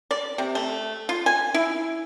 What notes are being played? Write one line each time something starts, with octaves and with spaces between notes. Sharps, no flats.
D5
C3
A3
F4
G#5
E4